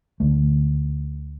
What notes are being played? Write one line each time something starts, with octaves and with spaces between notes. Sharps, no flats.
D2 D3 A3